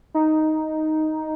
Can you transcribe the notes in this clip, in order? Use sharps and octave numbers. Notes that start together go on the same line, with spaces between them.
D#4